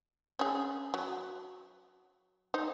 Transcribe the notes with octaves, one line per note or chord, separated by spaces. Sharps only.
C#4 G#4
F#3
D#4 C5